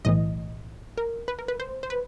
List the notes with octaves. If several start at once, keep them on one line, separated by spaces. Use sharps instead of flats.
B1 A2 E3 D#5
A#4
B4
A#4
B4
C5
C5
B4